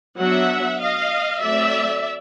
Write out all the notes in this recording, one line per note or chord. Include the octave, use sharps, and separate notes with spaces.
F#3 B3 D4 E5 F#5
D#5 F5
F#3 A3 C4 D5 E5